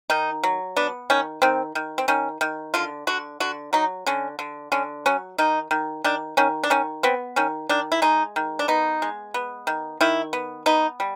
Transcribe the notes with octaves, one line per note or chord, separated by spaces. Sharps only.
D#3 D#4
F#3
B3 D4
D#3 C#4
D#3 C4
D#3
C4
D#3 C#4
D#3
D3 F4
D3 F#4
D3 F#4
F#3 D#4
D3 C#4
D3
D3 C#4
F#3 C#4
D#3 D#4
D#3
D#3 D4
D#3 C#4
D4
D#3 C#4
B3 C4
D#3 C#4
D#3 D4
E4
G#3 D#4
D#3
D4
B3 D#4
G#3
B3
D#3
D#3 E4
B3
B3 D#4
G3